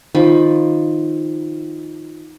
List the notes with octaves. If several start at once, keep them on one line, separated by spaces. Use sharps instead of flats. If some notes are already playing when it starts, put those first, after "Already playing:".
D#3 F3 B5